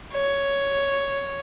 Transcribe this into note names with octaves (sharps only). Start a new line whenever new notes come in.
C#5